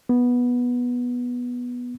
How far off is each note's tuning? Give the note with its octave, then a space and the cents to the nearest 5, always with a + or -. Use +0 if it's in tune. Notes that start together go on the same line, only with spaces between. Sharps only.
B3 -10